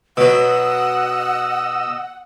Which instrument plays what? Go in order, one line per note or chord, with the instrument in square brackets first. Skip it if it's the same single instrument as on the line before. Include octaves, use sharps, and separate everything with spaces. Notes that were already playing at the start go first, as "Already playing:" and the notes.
[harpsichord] B2 F#3 [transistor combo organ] D#5 E6 [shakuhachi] F#5